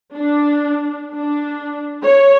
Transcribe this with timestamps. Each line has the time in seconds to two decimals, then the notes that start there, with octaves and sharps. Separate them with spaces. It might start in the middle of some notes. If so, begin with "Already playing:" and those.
0.15 D4
1.14 D4
2.03 C#5